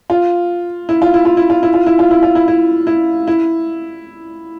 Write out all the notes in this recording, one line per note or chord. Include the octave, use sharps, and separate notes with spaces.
F4
E4
F4
E4
F4
E4
F4
E4
F4
E4
F4
E4
F4
E4
E4
E4
E4